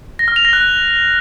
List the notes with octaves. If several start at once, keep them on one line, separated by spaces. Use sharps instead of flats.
A#6
F6
F7
A#6
F#6